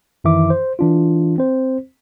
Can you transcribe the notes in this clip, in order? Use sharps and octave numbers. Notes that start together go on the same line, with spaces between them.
F#2 D#3 E3 E4 E5 D6
C5
E3 D4 F4
C4 C5